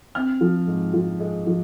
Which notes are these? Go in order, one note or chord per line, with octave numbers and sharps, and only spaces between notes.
C4 F6
F3
G#2
F3
G#3
F3